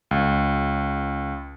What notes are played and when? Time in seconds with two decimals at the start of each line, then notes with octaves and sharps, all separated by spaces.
0.11 C#2